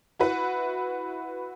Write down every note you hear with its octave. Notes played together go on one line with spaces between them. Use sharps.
E4 F#4 B4